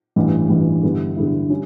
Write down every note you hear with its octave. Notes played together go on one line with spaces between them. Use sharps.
A1 G2 E3
A1 G2 E3
G2 D3 G3 B3 E4
G2 D3 G3 B3 E4
G3 C#4